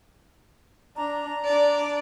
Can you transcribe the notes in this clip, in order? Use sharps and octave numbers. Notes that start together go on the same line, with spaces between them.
D4 A#5
D4 D5